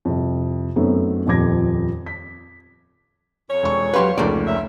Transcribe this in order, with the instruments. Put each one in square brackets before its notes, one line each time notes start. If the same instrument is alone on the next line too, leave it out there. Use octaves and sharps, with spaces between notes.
[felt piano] C2 F2
F#2 A3 B3 C4 D#4
D#1 F2 F3 D6 G#6 A#6
B6
[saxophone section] F2 C#5
[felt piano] E1 C#6
[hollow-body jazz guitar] F#3 G4 B4 [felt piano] F5 C6
[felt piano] F1 C#2 [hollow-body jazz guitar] A3 A#3 D5
[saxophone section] A#2 C#4 E5